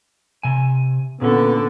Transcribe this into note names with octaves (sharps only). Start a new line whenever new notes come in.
C3 G#5
A#2 D3 B3 C#4 A4